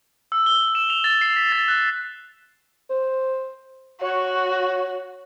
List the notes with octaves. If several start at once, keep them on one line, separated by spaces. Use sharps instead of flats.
E6
G7
E7
F7
A6
C7
B6
A6
F#6
C5
F#4 C#5